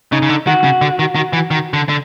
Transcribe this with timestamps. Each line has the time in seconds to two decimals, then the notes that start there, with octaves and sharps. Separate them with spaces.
0.12 C#3 D#4
0.22 C#3
0.29 D3
0.47 D#3 F#4
0.64 C#3
0.81 D3
0.99 D#3
1.15 D#3
1.33 E3
1.51 D#3
1.73 D3
1.89 D3